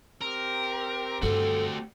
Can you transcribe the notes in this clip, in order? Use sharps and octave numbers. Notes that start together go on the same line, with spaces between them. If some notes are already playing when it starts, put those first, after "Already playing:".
C4 G4 A#4
G2 A3 D4 F#4 A4